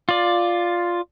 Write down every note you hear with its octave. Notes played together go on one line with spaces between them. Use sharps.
F4 D5